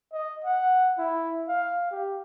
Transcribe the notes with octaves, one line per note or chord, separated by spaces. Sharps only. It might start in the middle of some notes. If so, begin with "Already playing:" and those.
D#5
F#5
E4
F5
G4